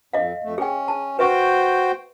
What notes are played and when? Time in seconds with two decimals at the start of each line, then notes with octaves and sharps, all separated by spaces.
0.13 F2 D#5 F5
0.43 F2 A3
0.58 C#4 G#4 G5
0.88 A5
1.19 F#4 B4 C5 E5 G5 C#6